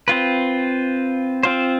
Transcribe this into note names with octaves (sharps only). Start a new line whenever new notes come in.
C4 F4 B4
C4 F4 C5